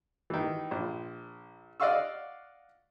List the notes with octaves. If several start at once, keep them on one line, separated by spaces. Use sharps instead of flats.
D#3 E3
A#1
D5 D#5 F5 F#5 C#6 E6